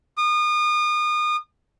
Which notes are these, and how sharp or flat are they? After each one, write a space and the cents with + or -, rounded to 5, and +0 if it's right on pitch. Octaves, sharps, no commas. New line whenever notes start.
D#6 -35